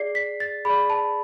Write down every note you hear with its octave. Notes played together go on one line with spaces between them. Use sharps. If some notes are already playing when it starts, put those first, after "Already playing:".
Already playing: G#4 D5 C7
B6
A6
G#4 D5 B5
A5